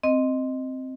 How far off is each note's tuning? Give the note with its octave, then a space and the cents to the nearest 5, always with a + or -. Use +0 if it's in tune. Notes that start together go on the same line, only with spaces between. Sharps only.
C4 +0 D#5 +0